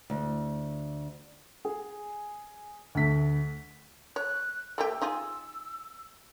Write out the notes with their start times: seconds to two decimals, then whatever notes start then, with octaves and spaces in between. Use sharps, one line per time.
0.10 D2
1.65 G#4
2.95 D2 A3 B6
4.16 C#5 F#6
4.78 A3 A#3 G4 E6
5.02 D#4 F4 G#4